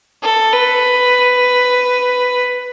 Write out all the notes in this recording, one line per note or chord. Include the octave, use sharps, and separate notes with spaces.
A4
B4